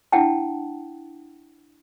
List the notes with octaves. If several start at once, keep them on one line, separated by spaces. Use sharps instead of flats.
D4 E4 F#5 G5 A5